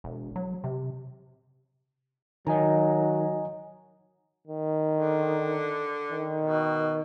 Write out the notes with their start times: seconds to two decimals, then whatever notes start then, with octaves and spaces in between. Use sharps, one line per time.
0.04 E1
0.36 F#3
0.64 C3
2.47 D#3 F#3 D#5 G#5 A#5
4.48 D#3
4.92 D3
6.12 D#3
6.41 B2